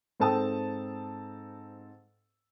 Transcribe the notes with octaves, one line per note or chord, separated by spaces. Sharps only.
G#2 C4 A4 G5 A5 D#6